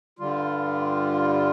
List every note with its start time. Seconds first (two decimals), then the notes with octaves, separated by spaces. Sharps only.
0.19 G2 D3 G3 F4